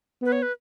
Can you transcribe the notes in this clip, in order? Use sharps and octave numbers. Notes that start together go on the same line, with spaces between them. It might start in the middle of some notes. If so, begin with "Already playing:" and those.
B3 B4
C#5
B4